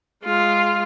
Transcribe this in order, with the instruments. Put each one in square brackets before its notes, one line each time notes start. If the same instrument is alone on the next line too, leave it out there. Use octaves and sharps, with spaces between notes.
[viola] G#3 F4